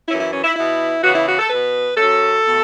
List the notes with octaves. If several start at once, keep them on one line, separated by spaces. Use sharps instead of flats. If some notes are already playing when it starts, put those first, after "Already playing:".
F#2 E3 C#4 E4
E4
C#4
E4
B2 B3 E4
C#3 E3 B3 F#4
E4
F#4
A4
B2 B3 B4
F#2 F#3 C#4 A4
B2 A3